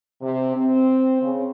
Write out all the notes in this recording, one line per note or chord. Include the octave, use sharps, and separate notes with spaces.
C3
C4
C#3